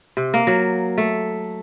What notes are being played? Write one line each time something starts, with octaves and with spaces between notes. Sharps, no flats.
C3
A#3
F#3
A3